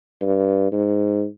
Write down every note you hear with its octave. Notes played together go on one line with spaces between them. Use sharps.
G2
G#2